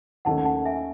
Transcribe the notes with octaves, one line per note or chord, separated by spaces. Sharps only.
D#2 D#3 A3 C#4 F#5 A5
F#5 A5
E5 G#5